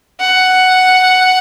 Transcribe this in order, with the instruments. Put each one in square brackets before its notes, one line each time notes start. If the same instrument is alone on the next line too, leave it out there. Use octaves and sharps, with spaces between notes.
[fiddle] F#5